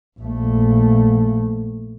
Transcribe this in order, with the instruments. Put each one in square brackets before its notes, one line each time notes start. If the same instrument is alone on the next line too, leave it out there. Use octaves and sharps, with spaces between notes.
[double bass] A#1 A3